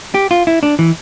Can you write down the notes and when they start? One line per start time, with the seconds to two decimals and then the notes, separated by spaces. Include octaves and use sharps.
0.14 G4
0.31 F4
0.47 E4
0.63 D4
0.79 E3